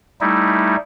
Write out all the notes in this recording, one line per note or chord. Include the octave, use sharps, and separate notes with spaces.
G3 A3 D#4 E4